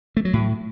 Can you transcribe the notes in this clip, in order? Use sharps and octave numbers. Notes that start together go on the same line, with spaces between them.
A3
F#3
A2